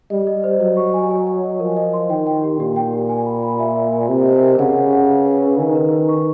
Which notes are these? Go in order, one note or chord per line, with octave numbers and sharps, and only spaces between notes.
G3 D#5
D#5
C5
F#3 D#5
C#6
G#5
G#5
G#5
D#5
F3 A#4
D#5
C6
D#3 G5
G5
G4
A#2 G4
G5
G4
G#5
B5
B5
E5
E5
G#5
C3 A#4
D#5
A#4
C#3 F#5
F#5
F#5
B4
B4
B4
D#3 G#5
B4
B4
C#6